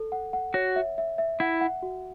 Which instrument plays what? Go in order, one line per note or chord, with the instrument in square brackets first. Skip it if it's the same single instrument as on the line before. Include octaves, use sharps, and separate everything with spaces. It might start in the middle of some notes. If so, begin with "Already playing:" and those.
Already playing: [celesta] A4
F#5
F#5
[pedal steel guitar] F#4 [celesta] C#5
[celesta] E5
E5
E5
[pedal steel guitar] E4 [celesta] F#5
[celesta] F#5
F#4